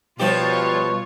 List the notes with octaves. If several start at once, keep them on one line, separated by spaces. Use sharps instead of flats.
B2 F3 G3 F4 G4 C#5